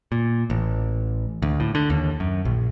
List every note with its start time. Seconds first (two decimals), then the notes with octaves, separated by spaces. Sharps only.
0.12 A#2
0.50 A1
1.42 D2
1.60 A2
1.75 D3
1.90 D#2
2.20 F#2
2.45 A#1